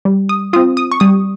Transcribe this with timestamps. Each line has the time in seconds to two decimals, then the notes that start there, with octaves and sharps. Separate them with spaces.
0.05 G3
0.29 D#6
0.53 C4 F4 D#6
0.77 D#6
0.92 C#6
1.00 G3 D#6